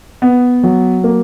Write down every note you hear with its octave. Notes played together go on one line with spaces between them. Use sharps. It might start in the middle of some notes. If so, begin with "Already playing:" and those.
B3
F#3
A#3